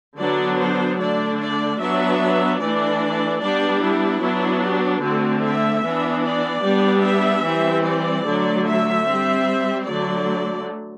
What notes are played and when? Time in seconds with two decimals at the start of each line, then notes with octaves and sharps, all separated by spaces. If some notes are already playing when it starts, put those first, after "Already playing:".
0.18 D3 F#3 B3 D4 D5
0.59 C5
0.99 D3 A3 D4 D5
1.39 D5
1.80 F#3 B3 D4 E5
2.60 E3 A3 D4 D5
3.42 G3 B3 D4 D5
3.82 E4
4.22 F#3 B3 D4
4.63 G4
5.03 D3 A3 C4 F#4
5.43 E5
5.84 E3 B3 D4
6.25 D5
6.65 G3 B3 D4
7.05 E5
7.45 E3 G3 C4
7.86 D5
8.27 D3 F#3 A3
8.67 E5
9.08 G3 C4
9.88 D3 F#3 A3 D5